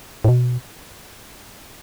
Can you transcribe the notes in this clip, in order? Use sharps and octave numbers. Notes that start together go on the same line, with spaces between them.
A2
B2